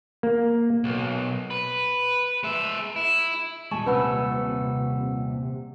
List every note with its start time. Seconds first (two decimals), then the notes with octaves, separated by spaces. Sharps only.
0.23 A#3
0.84 B1
1.50 B4
2.43 G#3 E5
2.96 E4
3.71 D#2 A#2 G3 G#3 G#5 A5 C#6
3.86 C3 C#4 B4 F#5 B5 E6